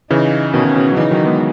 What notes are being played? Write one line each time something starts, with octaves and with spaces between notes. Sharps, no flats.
C#3 E3 D#4
B2 D#3 C#4
B2
B2
F#3
C#3 E3 D#4
D#3 F#3
G#3 B3